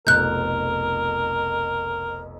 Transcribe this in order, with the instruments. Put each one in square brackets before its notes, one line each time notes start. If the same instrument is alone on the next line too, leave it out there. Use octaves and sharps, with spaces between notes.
[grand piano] F1 B1 F2 [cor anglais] A#4 [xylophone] F#6 G6